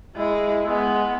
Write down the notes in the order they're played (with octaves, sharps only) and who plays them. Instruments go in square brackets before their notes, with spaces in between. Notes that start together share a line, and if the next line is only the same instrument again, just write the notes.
[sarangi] G#3 [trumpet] E4
[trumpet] G#3 [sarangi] B3